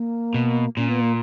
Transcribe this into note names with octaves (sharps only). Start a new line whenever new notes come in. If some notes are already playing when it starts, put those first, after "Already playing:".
Already playing: A#3
B2
A#2 C#4
B3
A#3